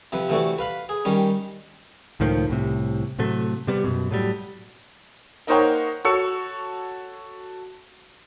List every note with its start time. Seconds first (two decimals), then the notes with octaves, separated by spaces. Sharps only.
0.12 C3 F3 B4
0.29 C3 E3 A3 F#4 D5
0.59 B4 F5 B5
0.89 G#4
1.05 D#3 G3 C#4
2.20 C#2 A2 D#3 F3
2.49 C2 A2 C3
3.19 A2 C3 F#3 A3
3.67 C3 G3 B3
3.84 F#2 B2
4.11 A2 F#3 G3
5.47 A#3 D#4 A#4 C5 C#5 F#5
6.05 F#4 A4 C#5 C#6 E6 C#7